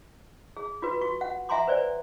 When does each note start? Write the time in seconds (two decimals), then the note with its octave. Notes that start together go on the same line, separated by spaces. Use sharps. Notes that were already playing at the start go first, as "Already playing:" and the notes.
0.57 G#4
0.82 F4 F#4 B4
1.01 F#4 C#6
1.21 F#5
1.49 E5 F#5 G#5 A#5 C6 D6
1.67 B4 C5 D5 G#5